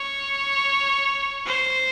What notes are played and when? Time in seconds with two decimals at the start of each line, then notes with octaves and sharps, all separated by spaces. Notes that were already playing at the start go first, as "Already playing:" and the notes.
Already playing: C#5
1.46 C5